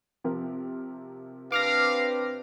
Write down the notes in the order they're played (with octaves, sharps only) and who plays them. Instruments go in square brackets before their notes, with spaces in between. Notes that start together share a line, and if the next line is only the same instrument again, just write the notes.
[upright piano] C3 F3 A#4
[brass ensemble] C4 D4 B4 [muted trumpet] F5 [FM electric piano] D6 F6 A#6